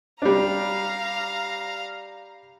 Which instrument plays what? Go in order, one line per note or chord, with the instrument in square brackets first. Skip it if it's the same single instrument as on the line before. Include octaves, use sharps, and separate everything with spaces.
[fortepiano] G3 D4 [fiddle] F5 A#5